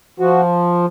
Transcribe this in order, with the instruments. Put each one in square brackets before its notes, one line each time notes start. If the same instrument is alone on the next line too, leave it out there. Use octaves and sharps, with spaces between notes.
[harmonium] F3 F#4